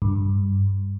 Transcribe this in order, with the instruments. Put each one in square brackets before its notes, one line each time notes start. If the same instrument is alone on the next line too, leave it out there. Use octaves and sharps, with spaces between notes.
[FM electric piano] G2